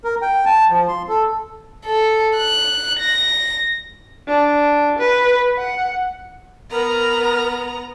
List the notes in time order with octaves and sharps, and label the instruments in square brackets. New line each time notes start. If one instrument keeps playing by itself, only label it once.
[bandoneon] A#4
G5
A5
F3
C6
A4
[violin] A4
F#6
A#6
[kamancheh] D4
B4
F#5
[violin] B3 A#5 [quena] A#4